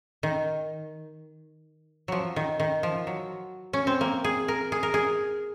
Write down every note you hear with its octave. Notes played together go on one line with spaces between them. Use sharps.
D#3
F3 F#3
D#3
D#3
F3
F#3
C#4
C4
A#3
G#4
A#4
G#4
A#4
G#4